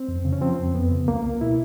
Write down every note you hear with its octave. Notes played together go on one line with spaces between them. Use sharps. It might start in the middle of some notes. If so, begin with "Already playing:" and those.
Already playing: C4
F2
C#3
C#4
F3 C4
F2
F2 B3
C#3
C#2 A#3
C#2
B2 E4